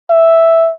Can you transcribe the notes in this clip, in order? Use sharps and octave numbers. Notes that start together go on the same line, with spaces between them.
E5